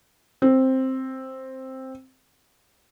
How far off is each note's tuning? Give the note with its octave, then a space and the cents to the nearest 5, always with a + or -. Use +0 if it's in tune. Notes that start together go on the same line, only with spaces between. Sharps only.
C4 +5